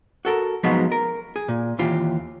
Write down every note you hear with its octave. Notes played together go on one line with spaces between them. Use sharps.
F#4 A4 A#4
F3 F#3 G#3 B3 D#4
A#4
G#4
A#2
D#2 E3 F4 G4